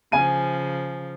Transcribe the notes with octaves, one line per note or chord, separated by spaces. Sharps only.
C#3 F3 G#5 D#7